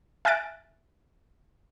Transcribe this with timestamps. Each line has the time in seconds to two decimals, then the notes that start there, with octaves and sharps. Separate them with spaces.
0.25 E5 G#5 F6 F#6 A6 D7